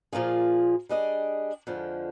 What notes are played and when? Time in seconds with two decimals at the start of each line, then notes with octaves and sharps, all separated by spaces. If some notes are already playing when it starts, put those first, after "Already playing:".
0.12 A#2 F3 A#3 F4 G#4
0.89 G3 D4 G#4 D#5
1.67 F2 D3 F3 G#3